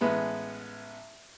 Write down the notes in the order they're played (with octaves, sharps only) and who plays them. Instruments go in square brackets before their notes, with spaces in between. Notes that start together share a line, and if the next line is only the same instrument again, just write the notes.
[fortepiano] A1 G#3 B3 B5